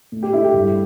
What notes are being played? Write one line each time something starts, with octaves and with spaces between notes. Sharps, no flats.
A2
G4
A3 E4
G4
G2